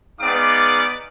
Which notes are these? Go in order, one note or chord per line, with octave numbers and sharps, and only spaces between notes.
G#3 B3 D#4 D5 F5 D6